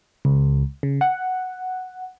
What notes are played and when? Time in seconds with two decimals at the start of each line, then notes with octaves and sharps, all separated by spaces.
0.25 C#2
0.83 C#3
1.01 F#5